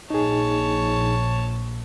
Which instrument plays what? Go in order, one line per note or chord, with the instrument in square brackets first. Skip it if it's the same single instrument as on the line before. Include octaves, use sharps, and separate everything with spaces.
[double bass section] A#1 [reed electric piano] D#4 G#4 [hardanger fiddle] C#5 A5